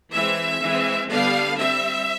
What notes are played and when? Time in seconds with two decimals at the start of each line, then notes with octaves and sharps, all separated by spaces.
0.13 E3 G#3 C4 E5
0.60 E3 G#3 C4
1.09 D3 G3 B3 D4 F5
1.57 G3 C4 E5